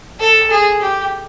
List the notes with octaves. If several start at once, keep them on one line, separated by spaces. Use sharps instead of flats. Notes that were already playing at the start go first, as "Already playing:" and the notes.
A4
G#4
G4